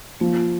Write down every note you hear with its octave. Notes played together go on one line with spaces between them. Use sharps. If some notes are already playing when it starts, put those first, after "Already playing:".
F3 A#3